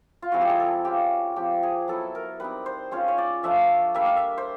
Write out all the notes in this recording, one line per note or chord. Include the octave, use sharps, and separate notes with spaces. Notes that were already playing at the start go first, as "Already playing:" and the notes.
F4
F3 G#3 C4 E4 F#4
G4
G#4
A4
G#3 C#4 F4 G4
F3 G#3 C4 G4
G#4
F#3 B3 E4 A4
A#4
G3 C4 D#4 B4
C5
G#3 C#4 F4 C5
C#5
D5
F3 A3 D4 F4 E5
G3 A#3 D4 E5
F5
E5
C5